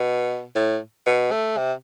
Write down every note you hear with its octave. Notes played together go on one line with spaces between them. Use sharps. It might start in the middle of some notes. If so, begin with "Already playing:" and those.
Already playing: B2
A2
B2
A3
C3